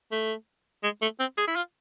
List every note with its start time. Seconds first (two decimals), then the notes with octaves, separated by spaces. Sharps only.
0.11 A3
0.83 G#3
1.02 A3
1.20 C4
1.38 G#4
1.48 E4
1.56 F4